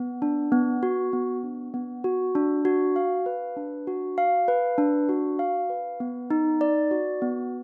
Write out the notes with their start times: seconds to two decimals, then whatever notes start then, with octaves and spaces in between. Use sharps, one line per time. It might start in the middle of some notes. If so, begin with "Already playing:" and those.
Already playing: B3
0.22 D4
0.52 B3
0.83 F#4
1.13 B3
1.43 D4
1.74 B3
2.04 F#4
2.35 D4
2.65 F#4
2.96 F5
3.26 B4
3.57 D4
3.87 F#4
4.18 F5
4.48 B4
4.78 D4
5.09 F#4
5.39 F5
5.70 B4
6.00 B3
6.30 D#4
6.61 D5
6.91 F#4
7.22 B3